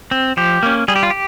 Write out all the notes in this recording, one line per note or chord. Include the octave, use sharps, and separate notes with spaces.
C4
F3 G4
A#3 C#4
G3 G#4
G4
F4
G4